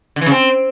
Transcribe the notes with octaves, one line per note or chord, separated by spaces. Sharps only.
D3
E3
C#3
C4